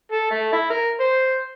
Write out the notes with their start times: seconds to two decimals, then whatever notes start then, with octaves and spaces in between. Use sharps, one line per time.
0.12 A4
0.31 A3
0.52 E4
0.70 A#4
1.00 C5